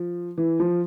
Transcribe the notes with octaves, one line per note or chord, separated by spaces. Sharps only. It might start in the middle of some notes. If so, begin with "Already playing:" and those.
Already playing: F3
E3
F3